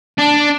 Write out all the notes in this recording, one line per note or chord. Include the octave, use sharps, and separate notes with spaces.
D4